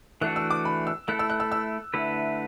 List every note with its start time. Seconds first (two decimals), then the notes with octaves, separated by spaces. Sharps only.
0.21 E3 A3 D4 F#4 F#6
0.36 E6
0.51 D6
0.65 B5
0.87 E6
1.08 A3 E4 A4 F#6
1.19 E6
1.30 F#6
1.40 E6
1.52 E6
1.94 D3 A3 E4 B4